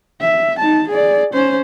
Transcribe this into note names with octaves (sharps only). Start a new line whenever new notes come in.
E5
D#4 A5
G#4 D5
C#4 C5